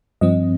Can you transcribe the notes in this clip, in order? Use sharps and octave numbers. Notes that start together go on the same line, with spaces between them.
G2 F3 C4 D#5